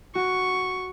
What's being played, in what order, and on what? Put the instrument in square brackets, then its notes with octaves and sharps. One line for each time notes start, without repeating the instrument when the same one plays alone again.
[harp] F#4 [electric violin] C#6